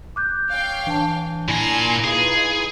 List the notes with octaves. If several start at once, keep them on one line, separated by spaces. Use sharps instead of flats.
D6 F#6 G6
C#5 F5 G5
E3 D4 A5
A#2 E4 G#5 A#5 C7
D#4 F4 G#4 B4